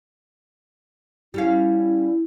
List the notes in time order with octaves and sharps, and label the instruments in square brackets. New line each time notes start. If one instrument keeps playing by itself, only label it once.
[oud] G3 C#4 F5 [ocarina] E4